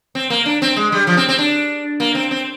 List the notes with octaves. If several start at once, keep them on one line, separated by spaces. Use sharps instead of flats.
C4
A#3
D4
C4
G#3
G3
F3
C4
C4
D4
A#3
C4
C4